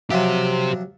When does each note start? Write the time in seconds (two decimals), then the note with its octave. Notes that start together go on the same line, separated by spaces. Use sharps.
0.11 C3 F3 F#3 G4 C5